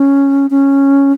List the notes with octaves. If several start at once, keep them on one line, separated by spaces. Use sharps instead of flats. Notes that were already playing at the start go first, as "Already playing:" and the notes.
Already playing: C#4
C#4